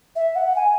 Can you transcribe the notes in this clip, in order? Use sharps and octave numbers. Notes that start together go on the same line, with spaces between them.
E5
F#5
G#5